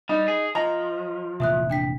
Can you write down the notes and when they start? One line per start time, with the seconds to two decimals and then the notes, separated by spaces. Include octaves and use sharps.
0.09 G3 D#4
0.28 G#4
0.55 F3 D#5 A#5
1.40 F1 A#2 E3 E5 D#6 F#6
1.70 D4 G5 B6